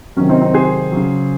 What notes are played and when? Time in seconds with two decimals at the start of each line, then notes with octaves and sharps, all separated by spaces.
0.17 C3 D#3 F#3 C#4
0.29 C4 D#4
0.41 C4 D#4
0.54 G#4 C5
0.92 C#3 F#3